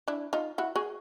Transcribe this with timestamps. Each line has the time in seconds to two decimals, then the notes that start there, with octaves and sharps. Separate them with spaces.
0.08 D4 E4
0.33 D#4 F4
0.58 E4 F#4
0.76 F#4 G#4